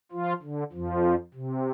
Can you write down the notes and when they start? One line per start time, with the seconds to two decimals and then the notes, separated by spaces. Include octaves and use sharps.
0.12 F3 F4
0.42 D3
0.72 F2 F3
1.34 C3